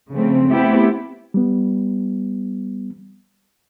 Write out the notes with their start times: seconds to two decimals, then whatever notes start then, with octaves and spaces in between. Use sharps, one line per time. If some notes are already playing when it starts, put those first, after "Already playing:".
0.12 C#3 F3 A3 C4
0.48 A3 B3 C4 E4 G4
1.34 G3 B3